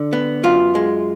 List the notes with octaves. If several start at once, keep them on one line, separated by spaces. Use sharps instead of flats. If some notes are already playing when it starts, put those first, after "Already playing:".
Already playing: D3
B3
F#2 F4
G#3